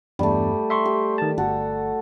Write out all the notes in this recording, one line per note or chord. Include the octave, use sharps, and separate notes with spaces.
E2 G2 G3 A3
E5 C6 C#6
G4
D#3 A5
G1 F#4 A4